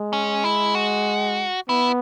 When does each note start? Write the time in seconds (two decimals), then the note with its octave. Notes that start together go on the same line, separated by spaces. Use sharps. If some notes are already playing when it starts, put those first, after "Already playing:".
Already playing: G#3
0.13 C#4
0.44 E4
0.75 F#4
1.69 B3 E4